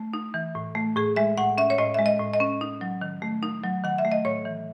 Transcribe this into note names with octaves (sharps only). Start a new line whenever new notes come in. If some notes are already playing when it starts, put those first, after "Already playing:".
Already playing: A3
D#4
E3
A2
A3
A2 G#4
G#3 E5
A2 F#5
C#4 E5
C#5
A2 D#5
G#3 E5
D#5
A2
D#5
C#4
D#4
F#3
D#3
A3
D#4
F#3
D#3 F#5
E5
A3
D#5
A2 C#5
E3